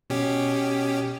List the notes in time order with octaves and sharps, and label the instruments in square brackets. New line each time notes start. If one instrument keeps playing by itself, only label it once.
[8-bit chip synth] B2 C#4 G4